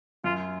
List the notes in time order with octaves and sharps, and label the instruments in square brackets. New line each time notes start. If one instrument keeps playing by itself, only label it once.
[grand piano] F#2 [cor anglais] F4